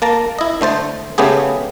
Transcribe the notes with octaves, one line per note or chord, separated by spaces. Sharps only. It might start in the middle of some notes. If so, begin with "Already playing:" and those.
A#3 A5 A#5
E4 D#5
D3 A3 C5 A5
C#3 A3 B3 G4 G#4